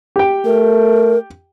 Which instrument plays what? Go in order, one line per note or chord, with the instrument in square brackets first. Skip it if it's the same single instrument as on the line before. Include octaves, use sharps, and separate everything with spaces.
[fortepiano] G4 G5
[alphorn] A3 [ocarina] A#4